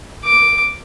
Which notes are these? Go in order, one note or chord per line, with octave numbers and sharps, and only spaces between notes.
D6